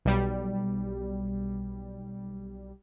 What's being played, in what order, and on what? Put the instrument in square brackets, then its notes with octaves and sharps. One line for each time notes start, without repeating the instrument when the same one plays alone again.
[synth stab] B1 G3